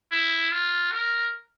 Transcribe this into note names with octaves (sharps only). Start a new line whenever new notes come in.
E4
F4
A#4